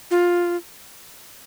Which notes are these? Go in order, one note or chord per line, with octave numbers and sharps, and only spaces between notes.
F4